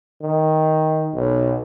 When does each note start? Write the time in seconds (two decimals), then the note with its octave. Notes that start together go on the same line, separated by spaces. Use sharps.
0.22 D#3
1.14 B1